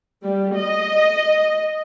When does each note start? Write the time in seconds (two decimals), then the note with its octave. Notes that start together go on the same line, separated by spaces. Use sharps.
0.23 G3
0.56 D#5